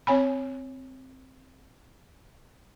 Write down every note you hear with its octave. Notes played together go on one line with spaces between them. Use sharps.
C4 C#5 G#5 B5